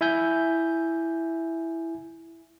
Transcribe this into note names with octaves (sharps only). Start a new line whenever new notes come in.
E4 E5 G#5 G6